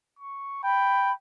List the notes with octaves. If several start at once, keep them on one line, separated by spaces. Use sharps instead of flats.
C#6
G5 B5